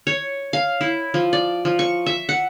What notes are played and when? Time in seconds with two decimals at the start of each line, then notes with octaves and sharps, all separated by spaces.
0.07 C#5
0.53 F5
0.81 E4
1.14 F3
1.33 D5
1.65 F3
1.79 C#6
2.06 E5
2.29 F#5